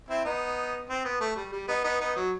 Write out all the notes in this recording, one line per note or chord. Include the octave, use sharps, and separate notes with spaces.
C4 E4
B3 D#4
C4
B3
A3
G3
G3
B3 D#4
B3 D#4
B3 D#4
F#3